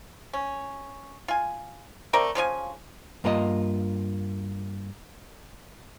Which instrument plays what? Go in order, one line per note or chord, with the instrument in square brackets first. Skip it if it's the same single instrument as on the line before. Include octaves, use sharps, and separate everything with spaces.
[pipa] C#4
F4 G#5
A3 C4 A#4 D5
C#3 F3 D4 G#5
[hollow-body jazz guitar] G2 A#3 F4 A4 D#5